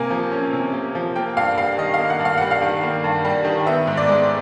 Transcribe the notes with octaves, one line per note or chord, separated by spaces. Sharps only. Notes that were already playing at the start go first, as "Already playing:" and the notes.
Already playing: C3 A#3 G#5
F3
C#4
C3
A#3
F3
A#3 G5
G2 F5
G3 F5
D#3 D#5
F5
A#3
F#5
G2
F5
G3 F#5
F5
D#3
A#3
G2
G3
D#3
B3 E5
G#2
D5
G#3